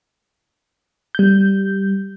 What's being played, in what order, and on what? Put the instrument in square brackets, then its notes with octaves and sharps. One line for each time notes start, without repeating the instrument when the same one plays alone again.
[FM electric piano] G3 G6